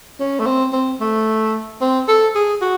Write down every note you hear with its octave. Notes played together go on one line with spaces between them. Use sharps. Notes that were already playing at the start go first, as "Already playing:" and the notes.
C#4
A3
C4
C4
A3
C4
A4
G#4
F#4